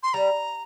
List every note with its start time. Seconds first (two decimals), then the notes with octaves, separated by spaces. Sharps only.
0.03 C6
0.14 G3 A#5